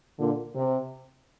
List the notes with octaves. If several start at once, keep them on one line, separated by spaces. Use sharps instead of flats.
A#2 D3
C3